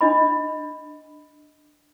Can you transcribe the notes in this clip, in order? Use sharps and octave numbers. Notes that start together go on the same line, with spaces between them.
D4 D#5 B5